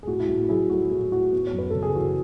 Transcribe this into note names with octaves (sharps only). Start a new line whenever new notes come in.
G#4
A2 F#4
E4
A2 F#4
F#3 E4 G#4
A3 F#4
A2 E4
A2 F#4
B3
C#5
F#2
B4
C#3 A4
G#4
E3 F#4